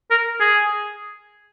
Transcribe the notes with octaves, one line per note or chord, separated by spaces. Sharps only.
A#4
G#4